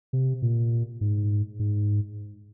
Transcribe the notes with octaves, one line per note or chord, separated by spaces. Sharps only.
C3
A#2
G#2
G#2